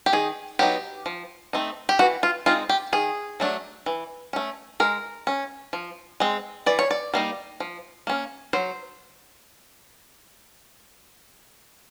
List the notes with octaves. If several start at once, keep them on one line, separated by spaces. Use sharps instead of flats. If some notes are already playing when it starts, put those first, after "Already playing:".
G4
D#3 G#4
F#3 B3 D#4 G4
F3
A3 C4 D#4
G4
E3 F#4
F4
G#3 C4 D#4 F4
G4
D#3 G#4
F#3 A3 D4
E3
A3 C#4
G#3 A#4
C#4
F3
G#3 C4
E3 D5
C#5
D5
G3 A#3 D#4
F3
A#3 C#4
F#3 C5